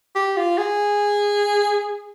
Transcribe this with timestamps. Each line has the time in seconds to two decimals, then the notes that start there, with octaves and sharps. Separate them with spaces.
0.16 G4
0.37 F4
0.58 G#4